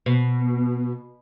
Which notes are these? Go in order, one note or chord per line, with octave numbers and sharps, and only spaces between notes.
B2